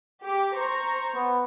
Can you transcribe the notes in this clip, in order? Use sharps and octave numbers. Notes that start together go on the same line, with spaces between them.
G4 D6
C5 A#5 C#6
B3